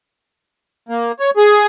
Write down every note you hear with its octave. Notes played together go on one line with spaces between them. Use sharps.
A#3
C#5
G#4